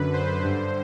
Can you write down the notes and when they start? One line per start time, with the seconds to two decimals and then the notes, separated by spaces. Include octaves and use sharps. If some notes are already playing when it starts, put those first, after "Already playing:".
Already playing: F#2 D3 B4
0.13 C5
0.43 G2 D3